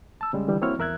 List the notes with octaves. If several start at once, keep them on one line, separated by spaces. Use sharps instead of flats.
A5 E6
C#3 G3 G#3
D3 E3 G3
A#3 C4 E4 F#4 C#5 F6
E2 A#4 E5 F#6 G#6